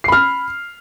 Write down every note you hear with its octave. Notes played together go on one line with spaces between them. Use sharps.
B5 F6 C7